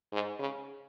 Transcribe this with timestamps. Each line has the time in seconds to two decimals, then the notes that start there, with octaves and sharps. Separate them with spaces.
0.12 G#2
0.40 C#3